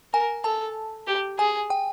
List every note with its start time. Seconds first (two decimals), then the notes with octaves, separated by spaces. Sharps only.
0.13 A#4 G#5
0.44 A4 A5
1.07 G4
1.38 G#4 G#5
1.70 G5